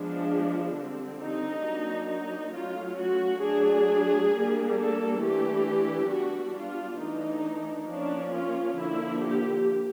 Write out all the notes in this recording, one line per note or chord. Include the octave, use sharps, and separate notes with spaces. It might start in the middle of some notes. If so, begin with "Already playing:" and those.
Already playing: F3 G#3 B3 D4
D3 G3 C4
D#4
F#3 A#3 D4
D#4
F#3 A3 C#4 F4
F#4
F#3 A3 D4 G#4
G3 A#3 D4
A4
E3 A3 D4 G4
G3 B3 D4 F#4
F4
E3 A3 D4 D#4
F3 A#3 C#4 D4
F4
D3 F3 A#3 E4
G4